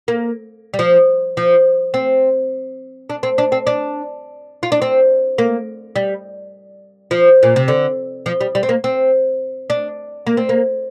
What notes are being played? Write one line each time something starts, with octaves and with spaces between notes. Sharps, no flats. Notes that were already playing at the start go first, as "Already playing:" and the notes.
A#3
G3
F3
F3
C4
D4
C4
D4
C4
D4
F4
D4
C4
A#3
G3
F3
A#2
C3
D3
F3
G3
G3
C4
A#3
C4
D4
A#3
C4
A#3